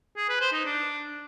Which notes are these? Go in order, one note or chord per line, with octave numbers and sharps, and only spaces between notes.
G#4
B4
C5
D#4
D4